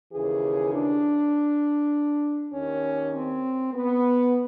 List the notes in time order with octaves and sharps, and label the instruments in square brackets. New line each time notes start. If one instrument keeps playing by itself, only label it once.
[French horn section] D#2 C#3 E3 G#4
D4
D#2 D#3 C#4
C4
B3